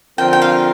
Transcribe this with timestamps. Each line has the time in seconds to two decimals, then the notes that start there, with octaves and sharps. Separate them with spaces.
0.18 D3 F3 C4 F4 A#4 G5
0.33 G5
0.42 F5